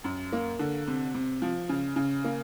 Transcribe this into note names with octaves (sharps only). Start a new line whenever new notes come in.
F#2
A#3
D3
C3
C3
F3
C#3
C#3
A#3